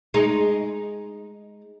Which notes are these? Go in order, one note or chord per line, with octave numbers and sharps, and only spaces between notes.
G#3 D#4